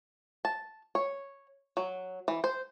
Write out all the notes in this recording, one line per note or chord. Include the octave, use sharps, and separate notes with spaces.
A5
C#5
F#3
E3
C5